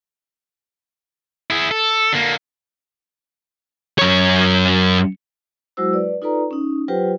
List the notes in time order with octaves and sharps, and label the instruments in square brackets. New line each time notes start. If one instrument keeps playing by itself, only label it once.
[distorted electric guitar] E4 G#4
A4
D3 A#3
F#2 C#5
[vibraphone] F#3 G#3 E4 F#4 C5 E6
B4 D5
D#4 F4 A4 B4 D5 A#5
C#4 D#4
F#3 F4 G4 B4 C5 G5